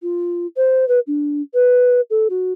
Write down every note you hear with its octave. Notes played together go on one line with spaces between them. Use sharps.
F4
C5
B4
D4
B4
A4
F#4